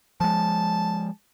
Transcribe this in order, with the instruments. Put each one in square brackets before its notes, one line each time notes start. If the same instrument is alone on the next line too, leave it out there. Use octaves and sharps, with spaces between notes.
[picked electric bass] F3 G#3 [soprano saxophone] A5